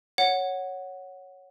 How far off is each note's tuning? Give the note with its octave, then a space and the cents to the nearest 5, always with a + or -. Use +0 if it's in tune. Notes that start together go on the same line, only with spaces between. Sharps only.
C#5 +0 F#5 +0